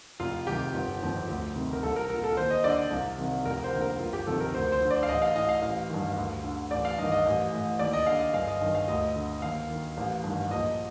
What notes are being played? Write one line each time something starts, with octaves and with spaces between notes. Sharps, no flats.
F1 F4
F2 C3 D#3 G4
G1
F2 D#3
D2
C3 D#3
A#4
C2 A4
A#4
A#2 A#4
A4
D#2 C5
D#5
D3 D5
C2
C3 D#3
F1 A#4
C5
D#2 D3
A#4
G1 F4
G4
F2 C3 D#3 A4
A#4
D2 C5
C5
D3
D5
F5
A1 D#5
F5
A2 D#5
F5
A1
G2 D#3
D2
D3
A1 D5
F5
G2 D#3 D#5
D#5
A1
A2
D#2 D5
D#5
D3 F5
D#5
G1 F5
D#5
G2 D#3 D#5
F5
D2 D#5
D3
D#2 F5
D#3
A1
G2 D#3
A#1 D#5